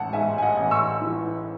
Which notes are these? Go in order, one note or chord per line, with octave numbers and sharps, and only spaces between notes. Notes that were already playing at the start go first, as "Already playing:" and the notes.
Already playing: A1 F#5 A5
G#2 E5 G#5
G#5
D#5 F#5
A1
C#6 E6
E3